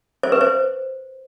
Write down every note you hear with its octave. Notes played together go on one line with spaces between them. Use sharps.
C5
B4
C5